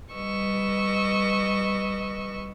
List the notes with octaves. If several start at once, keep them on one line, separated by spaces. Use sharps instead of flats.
G3 B4 D#5 C#6 E6